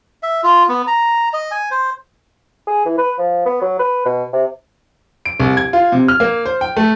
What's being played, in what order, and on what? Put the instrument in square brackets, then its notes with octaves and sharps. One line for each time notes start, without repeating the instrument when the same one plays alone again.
[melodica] E5
F4
B3
A#5
D#5
G#5
C5
[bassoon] G#4
E3
B4
F3
B3
F#3
B4
B2
C3
[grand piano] D7
C2
G#6
F4
C3
F6
A#3
C5
G5
A3